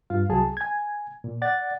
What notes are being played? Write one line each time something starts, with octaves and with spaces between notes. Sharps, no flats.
G2 F4 F5
C2 F#3 G#4 A5
G#5 G#6
A#2
D5 F#5 A6